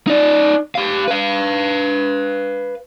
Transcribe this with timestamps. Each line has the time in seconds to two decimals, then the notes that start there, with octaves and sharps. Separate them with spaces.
0.07 D#4 D5
0.75 G4 F5
1.08 B4 F5